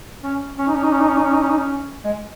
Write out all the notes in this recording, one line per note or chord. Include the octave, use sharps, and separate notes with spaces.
C#4
C#4
D#4
C#4
D#4
C#4
D#4
C#4
D#4
C#4
D#4
C#4
D#4
C#4
G#3